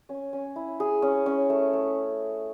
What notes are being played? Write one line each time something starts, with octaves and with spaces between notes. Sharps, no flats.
C#4
C#4
E4
G#4
C#4
C#4
A3
A3